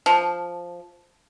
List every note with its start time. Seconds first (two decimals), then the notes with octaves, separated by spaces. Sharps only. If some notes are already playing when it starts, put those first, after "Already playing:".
0.06 F3